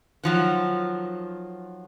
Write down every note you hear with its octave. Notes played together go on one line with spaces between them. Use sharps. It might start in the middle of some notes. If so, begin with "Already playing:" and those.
D#3 F3 F#3